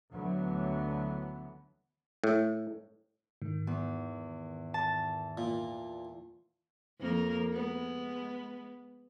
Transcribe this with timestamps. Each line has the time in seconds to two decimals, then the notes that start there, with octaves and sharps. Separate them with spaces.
0.12 D2 D3 E3 F#3 B3
2.24 A2
3.42 G#2 D#3
3.67 E2
4.74 A5
5.38 A#2
6.99 F2 A#3 A#4
7.52 G#3 B3